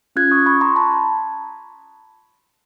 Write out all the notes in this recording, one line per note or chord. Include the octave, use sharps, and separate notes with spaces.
C#4 F4 G#4 F#6 G#6
C#6 D#6
B5 C#6
A#5 C6
A5 B5